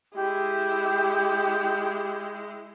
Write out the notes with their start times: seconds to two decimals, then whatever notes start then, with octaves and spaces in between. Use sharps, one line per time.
0.15 G#3 E4 G4